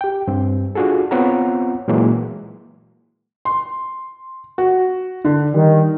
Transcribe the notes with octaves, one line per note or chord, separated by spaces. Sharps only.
G4 G5
G2 C4
D4 F4 F#4 G#4 A4
B3 C4 F4 C#5 F#5 A#5
A#2 E3 F#3 G#3 A#3
C6
F#4
D3
D#3 G3